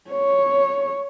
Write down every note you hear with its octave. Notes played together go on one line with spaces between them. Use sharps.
C#5